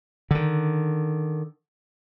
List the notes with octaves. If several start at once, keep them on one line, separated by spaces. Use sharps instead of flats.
D3 D#3